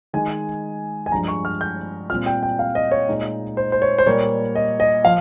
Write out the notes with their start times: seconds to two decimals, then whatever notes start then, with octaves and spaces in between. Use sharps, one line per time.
0.13 D#3 G#3 D#4 G#5
1.06 G#5
1.12 G2 F3 G#3 A#5
1.28 C#6
1.45 F6
1.61 G6
2.10 A#2 G3 C4 F4 F6
2.26 G5
2.43 G5
2.59 F5
2.75 D#5
2.92 C#5
3.09 A#2 G#3 D#4
3.57 C5
3.72 C5
3.82 C#5
3.98 C5
4.06 A#2 G3 A#3 C#5
4.55 D#5
4.80 D#5
5.05 F3 F5